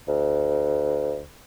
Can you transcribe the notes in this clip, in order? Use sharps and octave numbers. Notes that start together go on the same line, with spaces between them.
D2